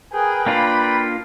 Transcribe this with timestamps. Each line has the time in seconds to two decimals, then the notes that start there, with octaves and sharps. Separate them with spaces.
0.13 G#4 A#4 B4 G5
0.46 A#3 D4 F4 B5